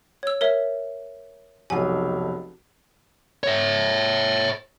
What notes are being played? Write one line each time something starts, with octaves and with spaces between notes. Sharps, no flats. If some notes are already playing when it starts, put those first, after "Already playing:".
C#5 E6
A#4 C#5 E5
F1 B1 G#5
C#5 E5